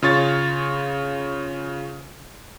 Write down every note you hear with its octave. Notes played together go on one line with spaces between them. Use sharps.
C#3 F4 C#5 A6